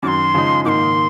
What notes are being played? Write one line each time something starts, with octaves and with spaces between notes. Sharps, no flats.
F#2 D#3 F#3 C6 D6
C#3 F3 G#3 D#4
G#2 D#3 A#3 D#4 C6 D6